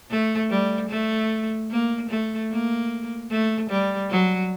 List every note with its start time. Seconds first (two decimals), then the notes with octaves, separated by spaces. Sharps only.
0.10 A3
0.50 G3
0.89 A3
1.70 A#3
2.10 A3
2.51 A#3
3.30 A3
3.70 G3
4.10 F#3